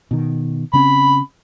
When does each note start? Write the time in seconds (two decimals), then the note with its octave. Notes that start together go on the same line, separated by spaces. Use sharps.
0.11 B2 D#3
0.73 C#3 C4 C#4 B5